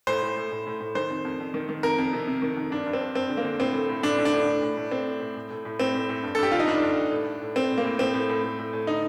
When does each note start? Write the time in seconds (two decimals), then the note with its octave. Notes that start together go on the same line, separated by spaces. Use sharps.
0.07 A2 C5
0.22 A2
0.37 A2
0.52 A2
0.67 A2
0.80 A2
0.95 D#3 C5
1.10 F2
1.25 F2
1.40 F2
1.54 D#3
1.69 D#3
1.83 F2 A#4
1.98 F2
2.13 C3
2.27 C3
2.42 D#3
2.57 F2
2.71 G2 D4
2.86 G2
2.93 C4
3.01 G2
3.15 G2 C4
3.30 D3
3.37 A#3
3.45 D3
3.60 A2 C4
3.74 A2
3.89 A2
4.03 A2 D4
4.18 A2
4.25 D4
4.33 A2
4.47 A2
4.62 A2
4.77 A2
4.91 A2 C4
5.06 A2
5.21 A2
5.36 A2
5.50 A2
5.65 A2
5.79 A2 C4
5.94 A2
6.09 A2
6.23 G2
6.35 A4
6.38 G2 G4
6.51 D3 F4
6.59 D#4
6.67 G2 D4
6.82 G2
6.97 G2
7.11 A2
7.26 A2
7.41 A2
7.56 A2 C4
7.70 A2
7.78 A#3
7.85 A2
7.99 A2 C4
8.14 A2
8.29 A2
8.43 A2
8.59 A2
8.73 A2
8.87 D3 D#4